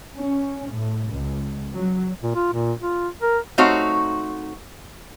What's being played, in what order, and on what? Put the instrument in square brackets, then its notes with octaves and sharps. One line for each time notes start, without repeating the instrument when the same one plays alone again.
[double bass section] C#4
A2
C#2
F#3
[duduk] A#2
F4
A#2
F4
A#4
[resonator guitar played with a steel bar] A3 C4 D#4 F#4 C#5 F5